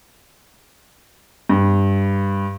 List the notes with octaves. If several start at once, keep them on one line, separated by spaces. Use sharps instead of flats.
G2